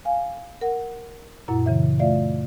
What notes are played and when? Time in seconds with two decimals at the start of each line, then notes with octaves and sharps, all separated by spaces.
0.05 F5 G#5
0.61 A#4 F#5
1.48 F#2 A#2 E4 F#5 A#5
1.66 C#3 E3 E5
1.99 A3 F4 D5 E5 F5